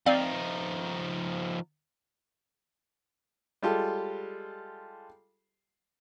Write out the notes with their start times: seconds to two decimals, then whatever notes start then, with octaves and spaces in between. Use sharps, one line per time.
0.06 F3 C4 D#4 D5 F5
3.62 G3 G#3 F4 G4 A4